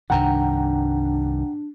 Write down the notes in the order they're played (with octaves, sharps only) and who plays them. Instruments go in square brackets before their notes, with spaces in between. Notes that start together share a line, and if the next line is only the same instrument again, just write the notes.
[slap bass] C2 G2 D#3 [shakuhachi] D4 [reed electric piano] F#5 G5 A#5